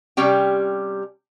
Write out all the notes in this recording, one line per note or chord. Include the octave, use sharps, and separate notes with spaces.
C3 G3 C#4 G4 G5